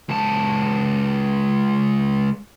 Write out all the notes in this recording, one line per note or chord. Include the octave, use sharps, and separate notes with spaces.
C#2 A5